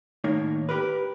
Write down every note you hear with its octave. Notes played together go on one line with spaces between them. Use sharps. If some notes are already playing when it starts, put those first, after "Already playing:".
A2 D#3 A#3 D#4 C#5
G4 A#4 B4